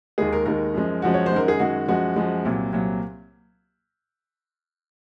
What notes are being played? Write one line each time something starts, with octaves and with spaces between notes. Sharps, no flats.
D#2 D#3 G#3 G#4
A#4
D#2 D#3 G#3 A#4
F#2 F3 G#3
F#2 F3 G#3 F#4
C#5
C5
F#2 D#3 G#3 A#4
G#4
F#2 D#3 G#3 F#4
F#2 F3 G#3 F#4
F#2 F3 G#3
C2 A#2 F#3
C2 A#2 F#3